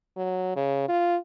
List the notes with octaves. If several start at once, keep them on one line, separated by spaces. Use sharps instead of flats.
F#3
C#3
F4